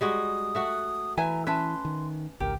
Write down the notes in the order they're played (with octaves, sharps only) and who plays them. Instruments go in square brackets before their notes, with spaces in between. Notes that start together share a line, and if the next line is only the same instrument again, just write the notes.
[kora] G3 G#3 F#4 [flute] D#6
[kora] A3 F#4 F#5
[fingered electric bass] E3 [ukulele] B4 E5 G#5 [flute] A#5
[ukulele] C#4 E5 A5 [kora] B4 [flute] C6
[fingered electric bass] D#3
[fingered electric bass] G#1 C#2 [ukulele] G4 [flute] A#4